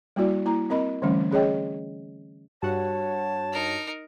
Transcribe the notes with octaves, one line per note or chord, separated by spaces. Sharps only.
G3 A#3 E4 F#4 D5
A#3 E4 A#5
C4 A#4 D#5 B5
D3 E3 G3 A3 C#4
C#4 G#4 C#5 D#5 G5
G2 F#4 C#5 F#5 A5
D#4 A#4